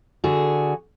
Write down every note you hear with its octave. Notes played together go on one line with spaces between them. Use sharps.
D3 F#4 G#4